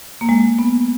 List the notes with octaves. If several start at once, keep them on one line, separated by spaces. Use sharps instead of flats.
A#3
G#3
B3